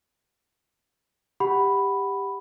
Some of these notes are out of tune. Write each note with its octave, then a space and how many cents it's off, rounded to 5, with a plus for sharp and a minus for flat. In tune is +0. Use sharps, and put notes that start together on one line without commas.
G4 +15 F#5 +15 B5 +0